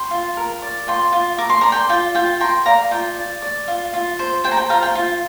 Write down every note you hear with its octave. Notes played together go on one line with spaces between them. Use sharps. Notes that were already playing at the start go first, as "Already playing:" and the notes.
Already playing: G5 C6
F4
A#4
D5
F4 G5 C6
F4
A#4 D6
C6
D5 A#5
G5 C6
F4 G5
F4 G5
A#4 G5 C6
D5 F5 A#5
F4 G5
D5
D5
F4
F4
C5
C5 G5
A#5
G5
F4 F5 A#5
G5
F4